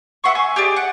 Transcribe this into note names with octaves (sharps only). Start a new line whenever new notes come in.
E5 F#5 C6 C#6
G#5
G4 G#4 D5
F#5